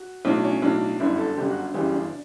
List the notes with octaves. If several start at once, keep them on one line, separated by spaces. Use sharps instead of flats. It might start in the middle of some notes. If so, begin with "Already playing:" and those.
Already playing: F#4
B1 A2 F#3 D4
C#4
B1 A2 F#3 D4
G1 F#2 D3 E4
A4
G1 F#2 D3 G4
F#4
G1 F#2 C#3 E3 G4
D4